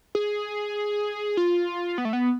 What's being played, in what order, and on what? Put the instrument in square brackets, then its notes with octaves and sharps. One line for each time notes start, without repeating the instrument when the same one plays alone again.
[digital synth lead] G#4
F4
B3
A3
B3